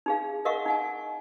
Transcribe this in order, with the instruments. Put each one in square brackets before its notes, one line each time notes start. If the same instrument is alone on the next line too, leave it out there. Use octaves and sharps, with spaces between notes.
[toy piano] D#4 G#4 F5
A#4 D#5 F5 F#5 C#6
D#4 F#5 G#5